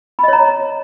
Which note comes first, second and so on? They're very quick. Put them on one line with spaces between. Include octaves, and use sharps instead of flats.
B5 D#5 C#5 A#5